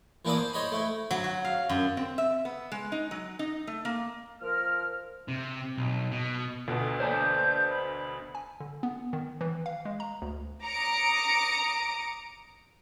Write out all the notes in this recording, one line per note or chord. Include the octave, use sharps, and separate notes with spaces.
E3 A#3 D4 E4 D5 D#6
C5
C5 C#5 D#5 B5
A3 E4
F#3
F#4
F5
F#2
C4
E5
B3
G#3
D#4
F#3
D#4
A3
A#3
F3 A#4 F6
C3
B1
B2
D2 B2
C5 D5 A5 G6
B5
G#5
D3
B3
D#3
E3
F5
G#3
A#5
D2
A#5 D6 D#6 C#7 D7